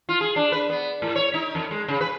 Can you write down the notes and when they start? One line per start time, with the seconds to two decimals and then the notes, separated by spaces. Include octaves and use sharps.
0.09 F4
0.21 G#4
0.36 D4
0.52 B4
0.70 B3
1.02 A2
1.16 C#5
1.34 D#4
1.55 F2
1.71 G#3
1.88 C#3
2.01 B4